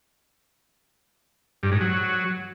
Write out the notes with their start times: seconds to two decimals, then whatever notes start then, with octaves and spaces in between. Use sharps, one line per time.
1.63 G2
1.72 G#2
1.81 F#3